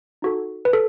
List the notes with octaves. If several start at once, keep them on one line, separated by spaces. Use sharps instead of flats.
D#4 F#4 A4
B4
A4